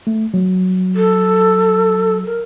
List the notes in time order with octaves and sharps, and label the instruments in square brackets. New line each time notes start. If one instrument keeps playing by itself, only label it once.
[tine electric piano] A3
F#3
[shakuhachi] A4
A#4